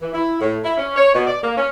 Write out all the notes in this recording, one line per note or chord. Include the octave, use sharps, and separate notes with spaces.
E3
E4
A2
E4
C#4
C#5
B2
D5
A#3
C#4